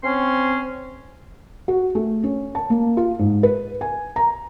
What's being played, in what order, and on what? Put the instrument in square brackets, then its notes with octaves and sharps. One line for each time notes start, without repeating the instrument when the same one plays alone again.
[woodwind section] C4 C#4 C6
[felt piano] F#4
A3
C#4
A5
A#3
F4
G#2
B4
G#5
A#5